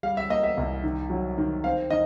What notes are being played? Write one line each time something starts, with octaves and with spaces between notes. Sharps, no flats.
G3 F5
E5
A#3 D#5
E5
C2
D#3
F#3
D#3
C4 F5
D#3 D#5